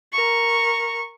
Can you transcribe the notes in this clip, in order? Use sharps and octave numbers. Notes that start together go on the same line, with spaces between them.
A#4 C#6